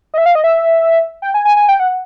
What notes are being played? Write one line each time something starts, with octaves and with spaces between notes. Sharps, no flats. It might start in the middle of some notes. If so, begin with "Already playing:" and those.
D#5
E5
F5
D#5
E5
G5
G#5
G#5
G#5
G5
F#5